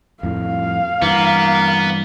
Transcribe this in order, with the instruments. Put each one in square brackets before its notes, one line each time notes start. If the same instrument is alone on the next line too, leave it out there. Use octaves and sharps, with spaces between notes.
[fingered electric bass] F2 A2 [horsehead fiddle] F5
[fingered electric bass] G2 E3 [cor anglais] A#3 [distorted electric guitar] B3